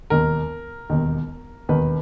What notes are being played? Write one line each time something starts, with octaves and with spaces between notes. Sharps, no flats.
E1 D#2 D#3 A#4
E1 D#2 D#3
E1 D#2 D#3 B4